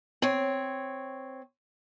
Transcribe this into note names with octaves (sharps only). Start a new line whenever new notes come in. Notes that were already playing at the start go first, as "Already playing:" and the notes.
C4 C#5